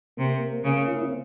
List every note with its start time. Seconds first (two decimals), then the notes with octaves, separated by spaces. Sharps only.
0.17 C3 A#3
0.64 C#3
0.88 F4
0.95 E4
1.01 C#4
1.09 C4